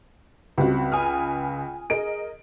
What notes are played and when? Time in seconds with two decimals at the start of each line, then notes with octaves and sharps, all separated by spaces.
0.58 C#2 G3 C4 F#4
0.92 G#5 D#6 F6
1.90 G#4 A#4 D#5 D7